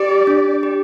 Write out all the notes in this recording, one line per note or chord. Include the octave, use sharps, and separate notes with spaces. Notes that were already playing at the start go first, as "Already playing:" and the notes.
Already playing: G4 D5
D4
G4